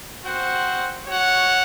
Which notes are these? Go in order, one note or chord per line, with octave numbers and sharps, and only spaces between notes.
C4 F#4 C5 F#5
F#4 C#5 F#5